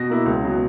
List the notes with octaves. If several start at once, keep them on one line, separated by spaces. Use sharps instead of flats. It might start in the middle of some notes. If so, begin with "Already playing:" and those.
Already playing: B2 A#6
A#3 E4
C#2
B2 F#3